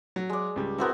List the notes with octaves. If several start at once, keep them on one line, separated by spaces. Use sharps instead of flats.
F#3
G#3 D5
C#2 G3
B3 C4 E4 F#4 A#4